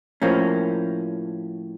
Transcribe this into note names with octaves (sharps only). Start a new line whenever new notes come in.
A2 F3 A#3 C#4